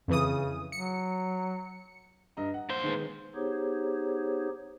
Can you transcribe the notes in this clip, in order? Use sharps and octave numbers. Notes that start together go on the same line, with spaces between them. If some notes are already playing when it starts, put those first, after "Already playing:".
F2 C#3 E3 D#6
F#3 C#7
G2 D#5 A#5
F#5
A#2 C5
D#3 G#3 B3
B3 D#4 G4 G#4 C5 C#5